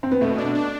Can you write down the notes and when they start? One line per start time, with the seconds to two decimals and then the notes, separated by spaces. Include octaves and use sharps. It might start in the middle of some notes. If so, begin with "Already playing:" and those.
0.03 C4
0.11 B3
0.21 B2 A3
0.38 D4
0.55 D4